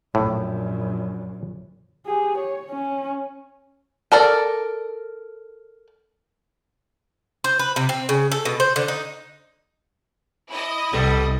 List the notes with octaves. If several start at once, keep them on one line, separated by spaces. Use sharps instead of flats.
A#1 F#2 A2
G4 G#4
C#5
C#4
A4 A#4 D5
C5
B4
C3
C4
C#3
A4
B2
C5
D3
D#4
E4 D#5
C2 G3 B3 A4